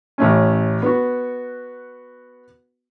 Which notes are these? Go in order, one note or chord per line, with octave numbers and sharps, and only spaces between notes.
A1 A3 C#4
B3 F#4